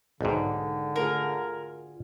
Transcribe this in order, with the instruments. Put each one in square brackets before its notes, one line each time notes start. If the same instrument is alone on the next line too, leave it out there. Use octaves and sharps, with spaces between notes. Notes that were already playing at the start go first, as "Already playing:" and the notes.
[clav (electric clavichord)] B1 G#2 [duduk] D3 [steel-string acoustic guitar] D#3 G#3 D5
[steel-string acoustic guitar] D2 F4 G#4 [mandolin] A#4